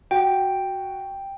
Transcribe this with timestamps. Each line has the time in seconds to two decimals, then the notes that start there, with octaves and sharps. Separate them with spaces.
0.11 F#4 G5